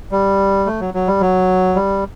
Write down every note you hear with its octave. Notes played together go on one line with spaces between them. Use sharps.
G3
A3
F#3
F#3
G3
F#3
G3